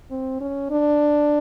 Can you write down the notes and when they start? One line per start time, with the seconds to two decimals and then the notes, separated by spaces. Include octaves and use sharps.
0.11 C4
0.41 C#4
0.71 D4